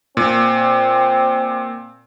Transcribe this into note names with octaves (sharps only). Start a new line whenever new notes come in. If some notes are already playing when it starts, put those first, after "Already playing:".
A#2 C4